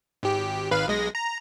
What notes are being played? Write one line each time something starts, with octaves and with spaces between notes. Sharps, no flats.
G#1 G4
G#1 B4 F5
B1 G#3 A#6
A#5